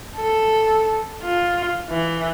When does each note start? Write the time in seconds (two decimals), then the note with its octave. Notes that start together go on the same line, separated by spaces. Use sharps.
0.16 A4
1.23 F4
1.90 E3